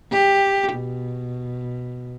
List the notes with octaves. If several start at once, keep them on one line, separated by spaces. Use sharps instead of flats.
G4
B2